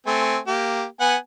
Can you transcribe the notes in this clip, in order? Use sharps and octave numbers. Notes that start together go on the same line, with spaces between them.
A3 C4 G#5
A#3 G4
B3 F#5 G#5